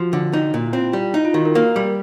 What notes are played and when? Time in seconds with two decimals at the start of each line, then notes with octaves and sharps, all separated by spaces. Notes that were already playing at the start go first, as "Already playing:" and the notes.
Already playing: F3 F#4
0.13 D3
0.33 D#4
0.54 A#2
0.66 E4
0.73 C4 F4
0.93 G3
1.14 D#4 E4
1.25 F4
1.34 D#3 F#4
1.45 A#4
1.55 A#3 A#4
1.76 G3